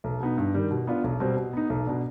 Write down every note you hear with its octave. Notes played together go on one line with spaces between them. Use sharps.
B1
B2 B3 D#4
G2
D#3 G3
B2
B3 D4 F4
B1
B2 G3 C4
B2
B3 D#4
B1
B2 B3 D4